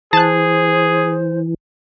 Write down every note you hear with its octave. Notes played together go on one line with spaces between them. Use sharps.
E3 G#4 C5 A5 F#6